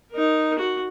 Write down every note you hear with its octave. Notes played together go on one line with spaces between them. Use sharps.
D#4 A#4
F#4